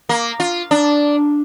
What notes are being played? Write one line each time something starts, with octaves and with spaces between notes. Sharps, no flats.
A#3
F4
D4